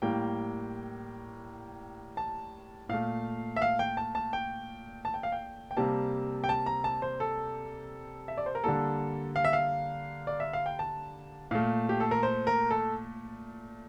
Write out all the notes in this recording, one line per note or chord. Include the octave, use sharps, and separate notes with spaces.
A2 G3 A#3 G5
A5
A#2 A3 F5
E5
F5
G5
A5
A5
G5
A5
G5
F5
G5
G5
C3 G3 A#3 A5
G5
A5
A#5
A5
C5
A4
E5
D5
C5
A#4
D3 G3 A#3 A4
F5
E5
F5
D5
E5
F5
G5
A5
A#2 A3 F5
G4
A4
A#4
C5
A#4
A4